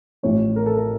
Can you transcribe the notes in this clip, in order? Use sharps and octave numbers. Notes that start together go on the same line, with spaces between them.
A1 A2 F3 C#5
A#4
A4
A#4